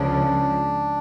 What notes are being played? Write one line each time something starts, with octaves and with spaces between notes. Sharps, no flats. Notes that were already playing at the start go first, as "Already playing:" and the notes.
Already playing: C#2 C#3 F3 D4